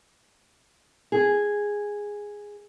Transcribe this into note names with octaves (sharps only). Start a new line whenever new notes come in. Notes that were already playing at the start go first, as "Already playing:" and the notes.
G#4